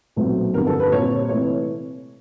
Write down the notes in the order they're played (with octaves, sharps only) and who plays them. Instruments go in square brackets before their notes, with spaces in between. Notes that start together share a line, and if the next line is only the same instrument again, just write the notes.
[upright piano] B1 A#2 F#3 A3 C4
G1 F2 D3 G3 A#4
A4
B4
A#2 G3 C4 C#5
C3 E3 A3 C#5